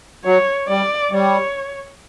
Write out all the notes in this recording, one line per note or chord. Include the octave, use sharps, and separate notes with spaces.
F#3 C#5
G3 D5
G3 C#5